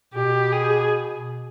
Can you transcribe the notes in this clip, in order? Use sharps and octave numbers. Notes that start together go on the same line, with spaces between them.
B2 G4
G#4